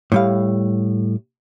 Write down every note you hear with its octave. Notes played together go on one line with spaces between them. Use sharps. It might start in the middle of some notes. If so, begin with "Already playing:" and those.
A2 G3 F5